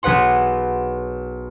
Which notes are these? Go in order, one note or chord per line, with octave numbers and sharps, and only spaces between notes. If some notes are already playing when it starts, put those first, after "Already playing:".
B1 G#4 B4 F#5 C6